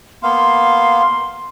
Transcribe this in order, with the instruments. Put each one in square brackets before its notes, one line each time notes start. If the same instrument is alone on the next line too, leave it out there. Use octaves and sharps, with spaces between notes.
[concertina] A#3 B3 F5 [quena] C6